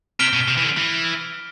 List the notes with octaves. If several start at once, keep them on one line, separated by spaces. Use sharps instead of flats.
C3 F6 B6 D7 G7
B2
C3
E3
D3
E3